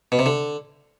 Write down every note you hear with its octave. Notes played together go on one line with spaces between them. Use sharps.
B2
C3
D3